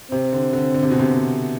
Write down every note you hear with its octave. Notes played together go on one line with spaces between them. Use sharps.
C3 C4
D3
D3
D3
C3
B2
C3